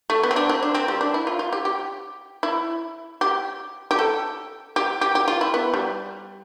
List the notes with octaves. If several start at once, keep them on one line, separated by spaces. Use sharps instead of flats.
A3
B3
C4
D4
C4
D4
C4
G3
D4
E4
F4
F4
G4
G4
E4
G4
G4
A4
G4
G4
G4
F4
E4
B3
G3